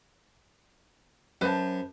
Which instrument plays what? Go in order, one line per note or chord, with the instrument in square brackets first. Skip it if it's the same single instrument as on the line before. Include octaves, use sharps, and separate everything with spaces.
[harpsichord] F#2 [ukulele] B4 C5 A5